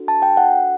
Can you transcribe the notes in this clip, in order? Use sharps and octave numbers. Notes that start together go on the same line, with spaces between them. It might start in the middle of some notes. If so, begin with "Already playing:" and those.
Already playing: D4 F#4 A4
A5
G5
F#5